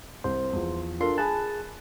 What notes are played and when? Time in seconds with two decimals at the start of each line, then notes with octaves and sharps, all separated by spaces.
0.24 C2 C5
0.53 E2 F3
1.01 D4 F4 A4 A#4 C6
1.18 G#4 G#5 A5 B5 F#6